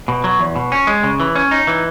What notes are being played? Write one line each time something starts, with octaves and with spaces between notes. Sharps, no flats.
B2
F#3
E2
B2
C#4
G#3
C#3
E3
C#4
D#4
E3